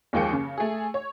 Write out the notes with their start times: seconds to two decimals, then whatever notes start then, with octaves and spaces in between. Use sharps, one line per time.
0.13 D#2 F3 G#3 A#3 G5 C#7
0.33 C#3
0.58 A3 G#4
0.94 C#5